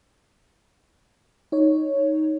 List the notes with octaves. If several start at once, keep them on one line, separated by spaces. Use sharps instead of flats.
D#4 C#5